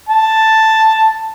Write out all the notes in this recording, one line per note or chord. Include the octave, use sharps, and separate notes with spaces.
A5